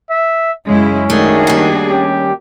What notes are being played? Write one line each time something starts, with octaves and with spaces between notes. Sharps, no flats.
E5
F#2 C#3 G#3 C#4 E4
D#3 A3 D4 F#4 G#4
D#2 G3
C#4 G4